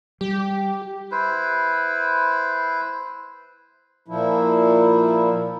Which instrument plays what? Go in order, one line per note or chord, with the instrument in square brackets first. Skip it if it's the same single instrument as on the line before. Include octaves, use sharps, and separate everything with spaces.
[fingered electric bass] G3 [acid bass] G4
[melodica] E4 B4 C5
[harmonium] A#2 F3 E4